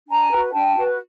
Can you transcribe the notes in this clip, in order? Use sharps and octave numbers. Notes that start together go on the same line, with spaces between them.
D4 G#5 A#5
F#4 B4
D4 G5 A5
F#4 B4